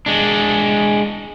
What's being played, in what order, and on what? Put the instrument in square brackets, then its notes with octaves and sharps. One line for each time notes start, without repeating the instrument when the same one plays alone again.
[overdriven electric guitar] G#3 D4